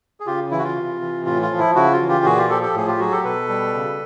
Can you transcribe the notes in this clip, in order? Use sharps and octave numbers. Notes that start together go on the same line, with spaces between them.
G#4
C#3 F4 G4
E3 E4
F#4
F4
C3
E3
A2 F4
F4
F3
E4
C#3 E4 F#4
F4
E3
F4 G4
A#2 F#4 G#4
F4 G4
F3 G4 A4
G4 A4
A2 G#4
F4 G4
F#3 F#4 G#4
G4 A4
B2 A4 B4
G3
C#3